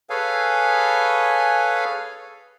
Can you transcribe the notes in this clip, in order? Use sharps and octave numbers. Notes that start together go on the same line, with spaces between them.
G#4 A4 B4 C#5 F5 G#5